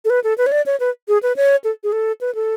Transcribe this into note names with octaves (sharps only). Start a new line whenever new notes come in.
A4
B4
A4
B4
C#5
D5
C#5
B4
G#4
B4
C#5
A4
G#4
A4
B4
A4